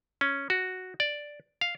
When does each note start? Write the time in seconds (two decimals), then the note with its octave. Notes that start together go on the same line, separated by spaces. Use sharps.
0.21 C#4
0.50 F#4
1.00 D5
1.61 F5